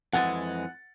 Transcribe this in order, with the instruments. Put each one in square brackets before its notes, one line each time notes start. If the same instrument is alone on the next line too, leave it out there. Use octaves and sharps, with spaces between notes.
[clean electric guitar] F2 E3 G#3 [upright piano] F#5 A6